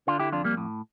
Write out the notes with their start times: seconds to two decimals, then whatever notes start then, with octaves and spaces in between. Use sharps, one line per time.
0.07 D3 D4 F4
0.19 E4 G4
0.32 F2 D4 F4
0.44 G3 A#3
0.57 A2